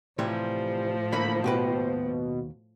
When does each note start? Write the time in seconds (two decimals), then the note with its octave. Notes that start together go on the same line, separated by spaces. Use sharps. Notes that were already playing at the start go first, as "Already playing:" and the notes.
0.19 A2 C3 E3 F3 G3 C5
1.12 D3 E3 A#3 B5
1.44 D#2 B2 G4 B4